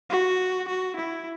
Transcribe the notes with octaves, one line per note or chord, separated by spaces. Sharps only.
F#4
F#4
E4